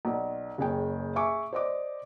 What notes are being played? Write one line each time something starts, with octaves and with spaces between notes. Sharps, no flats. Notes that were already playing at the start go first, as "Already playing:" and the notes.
B1 D5
F#1 C#4 G#4 G5
G#4 E5 G#5 C#6 D6
C5 D5 D#5 D6